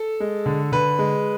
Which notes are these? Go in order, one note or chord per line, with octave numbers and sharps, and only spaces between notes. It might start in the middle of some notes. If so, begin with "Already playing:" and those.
Already playing: A4
G#3
D3
D3 B4
G#3